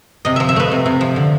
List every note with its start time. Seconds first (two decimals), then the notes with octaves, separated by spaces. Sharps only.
0.25 C3 D#5
0.36 F3 E5
0.49 E5
0.56 A3 B4
0.72 C3
0.86 C3
1.01 F3
1.16 D3